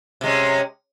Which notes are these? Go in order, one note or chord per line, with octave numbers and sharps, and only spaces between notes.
C3 G#3 C#4